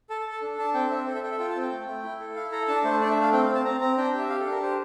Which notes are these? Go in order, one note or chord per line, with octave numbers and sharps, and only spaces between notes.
A4 A5
A5
A4
A5
D4
D4 A5
C4 G5
C4 E5
A4 C5
E5
A4 G5
E5
F4 G5
A5
C4 G5
A3
A3
E4
A4
E4 F5
A4 A#5
D4 A5
A3 C5
D4 D5
E5
A3
F5
C4 G5
F5
C4
A5
C4 A#5
C4 A#5
D4 G5
G4
E5
G4 F5
A4
D4 A#4
G4 C5